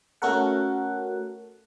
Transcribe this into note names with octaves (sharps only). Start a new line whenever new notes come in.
A3 C#4 F#4 A4 A#4 F#5